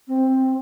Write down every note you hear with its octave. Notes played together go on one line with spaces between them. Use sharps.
C4